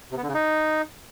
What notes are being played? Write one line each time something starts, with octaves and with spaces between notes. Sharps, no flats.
C3
B3
D3
C#3
D#4